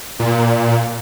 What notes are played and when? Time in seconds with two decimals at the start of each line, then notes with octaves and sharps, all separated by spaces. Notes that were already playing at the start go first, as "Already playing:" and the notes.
0.19 A#2